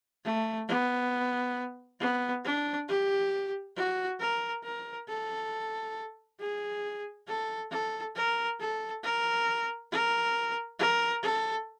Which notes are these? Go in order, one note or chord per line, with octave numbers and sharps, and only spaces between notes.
A3
B3
B3
D4
G4
F#4
A#4
A#4
A4
G#4
A4
A4
A#4
A4
A#4
A#4
A#4
A4